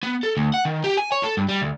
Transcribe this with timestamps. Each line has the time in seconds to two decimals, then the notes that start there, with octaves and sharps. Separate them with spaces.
0.03 B3
0.23 A4
0.37 D2
0.54 F#5
0.65 D#3
0.84 G4
0.97 G#5
1.12 C#5
1.23 A4
1.37 G2
1.49 G3
1.62 D2